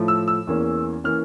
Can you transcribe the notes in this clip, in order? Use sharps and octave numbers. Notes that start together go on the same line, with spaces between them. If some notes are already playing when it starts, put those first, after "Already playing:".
Already playing: A2 F3 A3
E6
E6
E2 E3 A#3 C#4
E3 A#3 C#4 F6